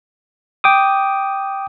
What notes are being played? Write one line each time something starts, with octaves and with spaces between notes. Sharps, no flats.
G5 D6 D#6